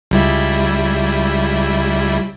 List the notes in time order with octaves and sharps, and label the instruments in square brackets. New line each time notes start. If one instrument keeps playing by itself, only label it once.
[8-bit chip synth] C#2 G3 E4